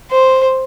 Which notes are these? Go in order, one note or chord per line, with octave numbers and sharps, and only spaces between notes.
C5